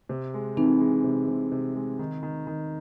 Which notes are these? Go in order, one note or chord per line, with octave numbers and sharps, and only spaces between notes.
C3
G#3
E3 C4 D#4
G#3
C3
C3
C3
G#3
D#3
D#3
D#3